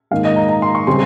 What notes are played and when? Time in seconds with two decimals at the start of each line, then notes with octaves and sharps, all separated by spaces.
0.11 G#2 D#3 A#3 D#4 F5
0.25 D#5
0.36 A#5
0.49 A#5
0.62 C6
0.75 C#6
0.87 C#3 G3 C4 C6